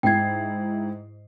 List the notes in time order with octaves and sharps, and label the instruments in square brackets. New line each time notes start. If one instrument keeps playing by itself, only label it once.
[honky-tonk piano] G#2 E4 C7 [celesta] G5 G#6